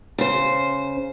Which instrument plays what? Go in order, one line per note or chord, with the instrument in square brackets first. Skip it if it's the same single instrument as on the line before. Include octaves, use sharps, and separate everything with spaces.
[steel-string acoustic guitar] C#3 C5